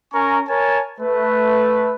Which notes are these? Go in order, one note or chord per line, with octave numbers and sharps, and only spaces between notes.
C#4 A#4 G#5 A#5 C#6
A#4 C#5 G#5 A5
A3 B4